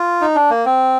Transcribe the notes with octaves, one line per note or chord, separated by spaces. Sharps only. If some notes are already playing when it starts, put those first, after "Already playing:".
Already playing: F4
D#4
D4
A#3
C4